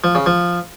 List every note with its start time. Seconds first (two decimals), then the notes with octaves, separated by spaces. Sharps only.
0.04 F3
0.15 C#3
0.26 F3